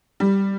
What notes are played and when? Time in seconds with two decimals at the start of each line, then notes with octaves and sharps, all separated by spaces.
0.20 G3